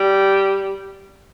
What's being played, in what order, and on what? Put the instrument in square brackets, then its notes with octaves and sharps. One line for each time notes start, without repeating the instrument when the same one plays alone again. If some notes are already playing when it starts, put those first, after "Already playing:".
Already playing: [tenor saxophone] G3